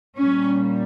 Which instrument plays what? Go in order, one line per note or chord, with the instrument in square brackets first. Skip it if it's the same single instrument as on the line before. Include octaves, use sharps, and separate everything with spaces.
[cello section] A#2 G3 C#4